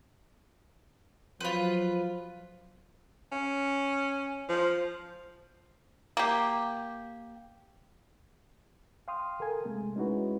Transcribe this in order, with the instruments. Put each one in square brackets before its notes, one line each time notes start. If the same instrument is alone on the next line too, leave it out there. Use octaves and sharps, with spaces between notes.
[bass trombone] F3 [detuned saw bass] F#3 [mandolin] F4 B4
[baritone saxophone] C#4
F3
[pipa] A#3 G4
[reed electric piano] F5 G5 C6 D#6 F6
A4 A#4 G#5
C3 G#3 A3
G#3 C#4 D#4 E4 F#4 B4